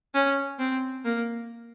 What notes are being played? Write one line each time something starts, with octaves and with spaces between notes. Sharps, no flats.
C#4
C4
A#3